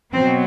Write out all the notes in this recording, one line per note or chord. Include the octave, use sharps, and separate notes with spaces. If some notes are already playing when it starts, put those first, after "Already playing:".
B2 F#3 B3 C4